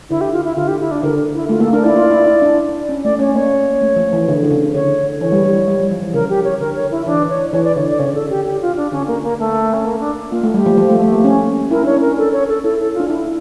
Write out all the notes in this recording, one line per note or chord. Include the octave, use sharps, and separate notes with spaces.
D3 E4
G4
F4
E4
D3 F4
G4
E4
D4
D3 A#4
E4
A3 F4
A#3 A4
D4 A#4
E4 D5
F4
E4
E4
D4
C#4
A3 D5
C#4 C#5
A#3 C#5
A3
F3
E3
D3
D3
C#3
D3 C#5
E3 C#5
G3
G3
F3
G3
F3
F3
E3
C#3 A#4
G4
C#5
D3 A#4
C#5
E4
E3 D4
C#5
E3 C#5
D5
D3 C#5
D5
C#3 C#5
A4
G4
G4
F4
D4
D3 C#4
A#3
A#3
A3
C#4
A#3
D4
A#3 F4
A3
G3 G4
F3
F3
A3
A3
A#3
C#4
E4 A#4
D4 C#5
C#4 A#4
D4
A4
C#5
A4
E4 A4
A4
F4
D4
E4